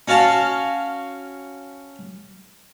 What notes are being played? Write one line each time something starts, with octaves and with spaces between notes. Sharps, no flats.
C#4 F#4 F5 A5